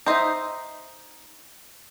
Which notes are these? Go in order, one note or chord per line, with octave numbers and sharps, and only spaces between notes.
D#4 C5 D#5 E5